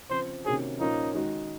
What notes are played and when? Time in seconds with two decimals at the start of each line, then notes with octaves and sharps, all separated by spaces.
0.10 C#3 F3 C4 C5
0.45 C3 D#3 A#3 C#4 F#4 G#4
0.80 A#2 F3 A#3 C#4 D#4 F4
1.14 D#3 G#3 D#4 F#4